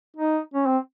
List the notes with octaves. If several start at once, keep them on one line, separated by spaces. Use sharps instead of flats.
D#4
C#4
C4